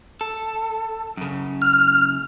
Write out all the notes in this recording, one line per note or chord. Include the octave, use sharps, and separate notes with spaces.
A4
F#2 C#3
F6